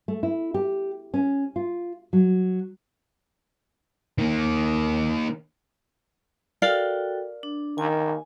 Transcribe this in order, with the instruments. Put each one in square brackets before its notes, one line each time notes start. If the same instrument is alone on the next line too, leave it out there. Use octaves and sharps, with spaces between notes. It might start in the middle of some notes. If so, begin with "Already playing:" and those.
[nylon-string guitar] A3
E4
G4
C#4
F4
F#3
[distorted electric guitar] D#3 A#3
[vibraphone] F#4 A4 G5 [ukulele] A#4 D5 F5
[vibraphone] D4
[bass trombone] D#3 [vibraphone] G#5